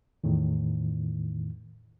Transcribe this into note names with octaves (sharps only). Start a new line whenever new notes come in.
E2 A2 D#3